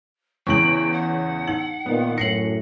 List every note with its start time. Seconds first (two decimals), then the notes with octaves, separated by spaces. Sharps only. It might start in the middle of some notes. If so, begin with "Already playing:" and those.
0.47 E2 C#3 G5 C#6 F#7
0.92 F#5
1.47 D#4 F#7
1.86 A#2 D#3 B3
2.18 F#2 A2 A#6 C7 C#7 F#7